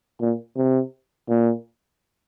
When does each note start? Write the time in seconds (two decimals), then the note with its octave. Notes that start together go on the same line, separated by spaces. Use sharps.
0.21 A#2
0.57 C3
1.29 A#2